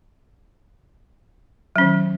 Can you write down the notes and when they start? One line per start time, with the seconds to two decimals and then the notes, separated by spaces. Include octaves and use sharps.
1.76 F#3
1.78 C#4
1.81 D#3